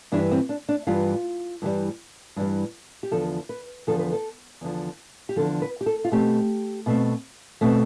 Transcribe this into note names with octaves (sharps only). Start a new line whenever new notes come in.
G2 E3 G3 D4
C4
D4
D4
G2 E3 G3 F4
G2 E3 G3
G2 E3 G3
G4
E2 D3 F3 A4
B4
E2 D3 F3 A4
B4
A4
E2 D3 F3
G4
E2 D3 F3 A4
B4
G4
A4
F4
B2 A3 C4 G4
B2 A3 C4
B2 A3 C4